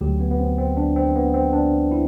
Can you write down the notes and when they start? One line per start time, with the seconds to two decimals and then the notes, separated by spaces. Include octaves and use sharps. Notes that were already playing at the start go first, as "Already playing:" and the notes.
0.01 D2 D3 F#3 G4
0.20 B3
0.31 B3
0.39 C4
0.58 C4
0.77 D4
0.96 C4
1.15 B3
1.34 C4
1.53 D4
1.92 E4